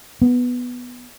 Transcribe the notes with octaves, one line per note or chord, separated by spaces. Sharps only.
B3